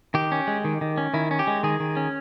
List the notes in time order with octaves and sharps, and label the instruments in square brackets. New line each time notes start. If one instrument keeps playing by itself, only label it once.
[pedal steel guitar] D#3 G4
C#4
G#3
D#3
D#3
C#4
D#3 E4
C#4
G4
G#3
D#3 G#4
D#3
C#4